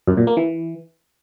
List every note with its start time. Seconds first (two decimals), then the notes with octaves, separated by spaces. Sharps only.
0.08 F#2
0.17 A#2
0.27 A#3
0.37 E3